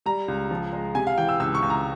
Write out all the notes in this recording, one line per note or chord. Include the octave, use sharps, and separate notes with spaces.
G3 A#5
C#2
F3
G#3
C3 G#5
F5
E3 G5
E6
C#2 E6
C#6
C#2
A#5